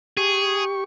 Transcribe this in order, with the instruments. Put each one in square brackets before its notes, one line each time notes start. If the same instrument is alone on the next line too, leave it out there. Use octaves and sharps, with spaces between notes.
[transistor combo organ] G4 C#6 [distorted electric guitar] G#4